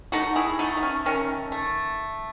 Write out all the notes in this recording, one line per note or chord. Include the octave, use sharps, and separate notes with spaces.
A3 D#4 F#4
E4 G#4
A3 D#4 F#4
D#4
C#4
D#3 C#4
A3